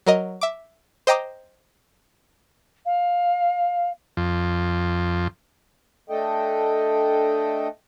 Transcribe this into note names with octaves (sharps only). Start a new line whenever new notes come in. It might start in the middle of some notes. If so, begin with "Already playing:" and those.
F#3 A#4 D#5
E5 D6
C5 D#5 G5 A#5 D6 D#6
F5
F2
A3 D4 A4 D#5 G5